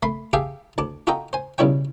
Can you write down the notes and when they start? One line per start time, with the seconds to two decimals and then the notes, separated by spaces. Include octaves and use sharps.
0.03 A3 B5 C6
0.33 G4 G#4 E5 F5 G5 A5
0.78 D2 A5 D6
1.07 F4 F#4 A4 D#5 G5 A#5
1.33 C5 G#5
1.58 B1 C#3 G3 E4 C#5 G5